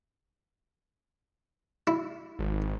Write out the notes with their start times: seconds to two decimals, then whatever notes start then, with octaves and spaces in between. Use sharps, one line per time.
1.87 E4
2.39 G#1